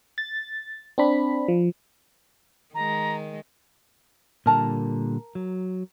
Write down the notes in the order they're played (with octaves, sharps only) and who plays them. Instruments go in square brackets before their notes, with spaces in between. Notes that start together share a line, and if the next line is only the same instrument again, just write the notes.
[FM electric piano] A6
C4 D4 B5
F3
[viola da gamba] D#3 G#3 [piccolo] A#5
[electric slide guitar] A#2 D3 G3 [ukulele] A#4 A5 A#5
[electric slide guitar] F#3